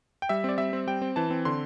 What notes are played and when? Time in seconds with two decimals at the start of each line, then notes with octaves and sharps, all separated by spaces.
0.22 G5
0.29 G3 E5
0.44 C4 D5
0.58 G3 E5
0.73 C4
0.87 G3 G5
1.02 C4
1.16 E3 A5
1.30 C4
1.45 D3 C6